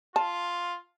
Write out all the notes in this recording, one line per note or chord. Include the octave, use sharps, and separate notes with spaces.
F4 A5